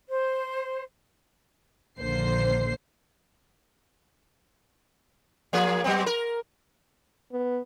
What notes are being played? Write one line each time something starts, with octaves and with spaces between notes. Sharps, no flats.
C5
A#1 D#2 D3 A#3 C5 C7
F3 A#3 G#4
F#3 B3 C4
A#4
B3